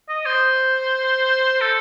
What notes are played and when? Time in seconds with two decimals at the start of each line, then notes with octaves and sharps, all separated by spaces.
0.09 D#5
0.26 C5
1.61 A4